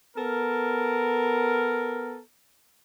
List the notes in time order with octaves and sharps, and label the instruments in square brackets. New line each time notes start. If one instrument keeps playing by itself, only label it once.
[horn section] B3 A4 A#4